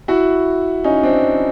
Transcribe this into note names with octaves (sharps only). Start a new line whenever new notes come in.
E4 F#4
C#4 D#4
C4 D4